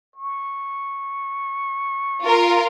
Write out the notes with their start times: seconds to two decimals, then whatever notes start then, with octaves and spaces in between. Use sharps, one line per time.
0.16 C#6
2.23 F4 A#4